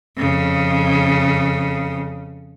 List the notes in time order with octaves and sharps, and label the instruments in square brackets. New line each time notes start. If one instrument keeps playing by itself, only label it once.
[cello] F2 C#3